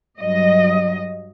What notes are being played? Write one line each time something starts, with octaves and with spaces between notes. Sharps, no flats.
G2 F#3 D#5